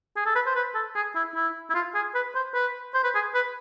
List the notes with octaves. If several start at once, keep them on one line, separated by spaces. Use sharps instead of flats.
G#4
A4
B4
C5
B4
A4
G#4
E4
E4
E4
F4
G#4
B4
C5
B4
C5
B4
G#4
B4